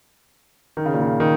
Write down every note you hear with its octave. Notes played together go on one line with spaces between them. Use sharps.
D#3
C#3
A#2
C#3
D#3